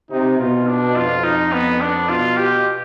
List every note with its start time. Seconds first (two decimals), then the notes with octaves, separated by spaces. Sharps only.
0.11 C3 D#4
0.39 B2 F4
0.67 D4
0.96 F2 F4
1.24 D#4
1.53 B3
1.81 D4
2.09 B2 F4
2.37 G4